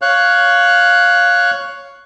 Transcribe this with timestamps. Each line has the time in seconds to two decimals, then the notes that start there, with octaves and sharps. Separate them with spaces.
0.02 C#5 F5 F#6